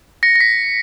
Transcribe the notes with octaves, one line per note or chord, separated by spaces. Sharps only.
A#6 C#7
A#6
B6